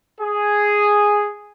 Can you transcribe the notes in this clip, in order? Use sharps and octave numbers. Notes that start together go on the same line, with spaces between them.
G#4